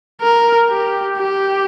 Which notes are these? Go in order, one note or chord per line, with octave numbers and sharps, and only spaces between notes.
A#4
G4
G4